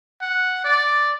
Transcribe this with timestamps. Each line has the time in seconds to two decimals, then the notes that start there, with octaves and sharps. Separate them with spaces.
0.21 F#5
0.64 D5